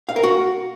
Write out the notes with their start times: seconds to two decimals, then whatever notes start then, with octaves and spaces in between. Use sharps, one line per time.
0.09 F5
0.16 A#4
0.23 F#4